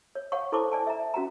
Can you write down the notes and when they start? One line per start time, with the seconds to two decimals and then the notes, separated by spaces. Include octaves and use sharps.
0.15 C#5
0.32 C#5 F5 F#5 C#6
0.52 E4 A4 C5 A5 C#6 D6
0.72 D5 G#5 A5
0.87 E5 A#5
1.14 C#4 F#4 F#5 A#5